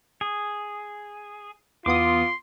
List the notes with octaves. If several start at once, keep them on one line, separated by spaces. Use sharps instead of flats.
G#4
E2 B3 F4 C6 D6 D#6